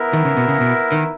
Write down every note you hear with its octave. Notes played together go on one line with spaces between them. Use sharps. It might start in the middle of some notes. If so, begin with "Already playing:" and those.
Already playing: B3 E4 A#4
D#3
C#3
B2
C#3
B2
D#3